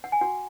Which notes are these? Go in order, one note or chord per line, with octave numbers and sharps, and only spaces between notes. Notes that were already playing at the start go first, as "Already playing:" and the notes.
F#5
G#5
F#4 F#5